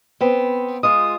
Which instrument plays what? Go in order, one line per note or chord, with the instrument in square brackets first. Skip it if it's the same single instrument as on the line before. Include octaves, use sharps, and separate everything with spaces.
[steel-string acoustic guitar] B3 C4
[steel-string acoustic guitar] G#3 F4 [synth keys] D#6